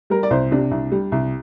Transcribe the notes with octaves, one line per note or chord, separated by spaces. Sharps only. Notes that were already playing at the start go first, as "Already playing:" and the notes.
G3 A#4
D5
C2 C5
C3 D4
C2
G3
C2